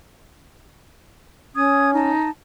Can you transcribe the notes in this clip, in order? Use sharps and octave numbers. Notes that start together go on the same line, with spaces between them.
C#4 D#6 G#6
D#4 A5